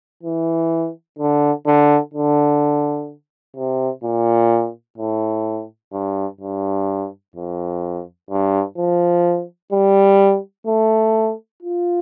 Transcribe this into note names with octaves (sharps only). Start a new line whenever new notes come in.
E3
D3
D3
D3
C3
A#2
A2
G2
G2
F2
G2
F3
G3
A3
F4